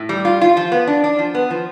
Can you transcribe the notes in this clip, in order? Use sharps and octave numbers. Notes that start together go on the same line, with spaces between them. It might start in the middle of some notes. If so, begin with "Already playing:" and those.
Already playing: A2
G3
F4
F4
F3
B3
D4
D4
F3
B3
F3